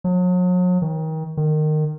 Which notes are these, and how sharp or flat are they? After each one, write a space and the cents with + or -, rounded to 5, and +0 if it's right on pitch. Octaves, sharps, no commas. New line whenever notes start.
F#3 -40
D#3 +30
D#3 -20